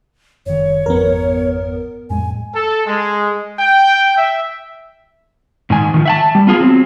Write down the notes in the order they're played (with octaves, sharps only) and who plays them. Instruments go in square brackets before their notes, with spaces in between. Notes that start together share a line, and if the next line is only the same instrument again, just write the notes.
[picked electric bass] F#1 D#3 [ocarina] C#5
[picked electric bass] G#1 F2 F3 [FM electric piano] B3 A#4
[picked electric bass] F2 A2 G#3 [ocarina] G#5
[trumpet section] A4
G#3
G5
E5
[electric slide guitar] G#2 D#3 G#5
D#3 F3
E5 F#5 A5
G3
B3 F4 G#4
F#3 C4